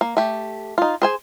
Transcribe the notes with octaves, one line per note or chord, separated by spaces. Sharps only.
A#3
A3 G4
D#4 F4
G#4 C5 G#5